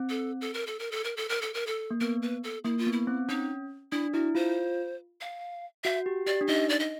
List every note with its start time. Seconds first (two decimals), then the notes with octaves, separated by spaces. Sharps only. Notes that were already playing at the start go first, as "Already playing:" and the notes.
Already playing: C4
0.09 A4
0.41 A4
0.54 A#4
0.67 A4
0.79 A#4
0.92 A4
1.04 A#4
1.17 A4
1.29 A#4
1.42 A4
1.54 A#4
1.67 A4
1.91 A#3
2.01 B3 A#4
2.22 B4
2.44 A4
2.64 A#3 E4
2.78 F4
2.87 B3
2.93 E4
3.07 C4
3.29 C#4 D#4
3.92 D4 E4
4.14 E4 F#4
4.35 F4 C5
5.21 F5
5.84 F#4 E5
6.06 G4
6.27 G4 D5
6.41 D4
6.48 D#4 D#5
6.69 D5
6.80 D#5